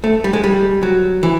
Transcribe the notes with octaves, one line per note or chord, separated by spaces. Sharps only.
A3
G3
G#3
G3
F#3
E3